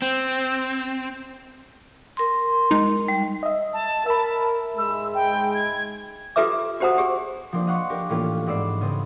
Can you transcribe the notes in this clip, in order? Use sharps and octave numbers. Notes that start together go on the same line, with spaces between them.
C4
A#4 C6
G#3 D#4
G3
D#5 E5
A5
A#4 E5 B5
G#2 G#3 E6
G5
G#6
F4 G4 A4 B4 E5 D6
F#4 G4 C5 F#5 A#5 D#6
G4 G#4
F3 A#3 C4 D4
D#5 F5 F#5 C6 C#6 C#7
D4 G4 A#4
A2 E3 A#3 C#4 D4 F4
G#2 B3 D5 E6 C7
C#3 B3 C4